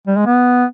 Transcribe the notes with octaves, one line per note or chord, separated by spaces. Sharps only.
G3
G#3
B3